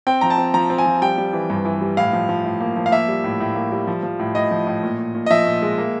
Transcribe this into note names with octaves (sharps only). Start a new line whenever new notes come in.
C4 G5
F3 A#5
A5
C4
F3 A#5
C4
G#5
F3
G3 G5
G3
E3
G2
E3
G3
A2 F5
F3
F3
A2
A#3
F3
F5
A#3 E5
G3
A2
A2
A#3
G3
F3
F3
A2
A2 D#5
F3
A2
A#2
A#2
A#2
D#5
F3 E5
A#2
G#3
A#3